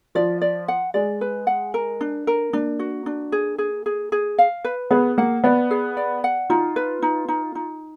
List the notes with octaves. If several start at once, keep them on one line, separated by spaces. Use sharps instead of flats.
F3 D5
D5
F#5
G#3 D5
B4
F#5
A#4
D4
A#4
A#3 D4
F#4
D4
G#4
G#4
G#4
G#4
F5
B4
B3 G#4
A#3 F#5
B3 D5
G#4
D5
F#5
D#4 F4
B4
D#4
D#4
D#4